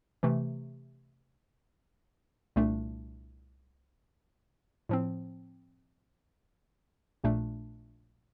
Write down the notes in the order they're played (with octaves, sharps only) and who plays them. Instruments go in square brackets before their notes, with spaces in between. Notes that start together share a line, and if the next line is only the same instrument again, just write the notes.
[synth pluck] C3 E3 A3
C2 A#2 A3 D4
A2 F3 C4
A#1 A#2 A3 D4